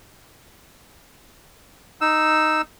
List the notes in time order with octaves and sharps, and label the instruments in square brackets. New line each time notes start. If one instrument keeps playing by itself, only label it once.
[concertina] D#4 E6